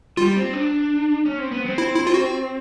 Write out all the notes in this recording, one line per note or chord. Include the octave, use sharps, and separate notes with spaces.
G3 F4
C4
D4
C#4
C4
B3
C4
E4
E4
F4
F#4